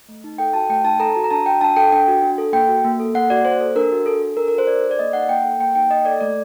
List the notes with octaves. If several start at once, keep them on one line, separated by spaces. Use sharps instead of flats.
A3
D#4
A4 G5
F#4 A5
A3 G5
D#4 A5
A4 A#5
F#4
A#5
D4 A5
F#4 G5
D4 A5
A4 G5
D4 G5
F#4
D4
A4
A#3 G5
F#4
A#3
A4
A#3 F#5
F#4 D5
A#3 C5
A4
D4 A#4
F#4
D4 A4
A4
D4 A#4
A#4
F#4
C5
D4 D5
A4
D5
A#3 D#5
D#4 F#5
A#3 G5
A4
A#3 G5
D#4 G5
A#3 D#5
A4 D5
A3 D5